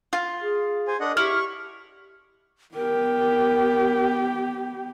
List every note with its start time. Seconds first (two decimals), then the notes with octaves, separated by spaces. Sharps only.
0.13 F4
0.40 G#4
0.88 C5 G#5
1.00 D4 A#4 D#5 F#5
1.17 E4 G4 C#6 F6
2.75 B3 G4 A#4